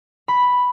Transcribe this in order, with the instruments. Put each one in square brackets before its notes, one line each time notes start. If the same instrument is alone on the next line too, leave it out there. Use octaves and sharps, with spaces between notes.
[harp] B5